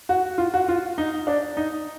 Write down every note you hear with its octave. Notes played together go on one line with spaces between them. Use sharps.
F#4
F4
F#4
F4
D#4
D4
D#4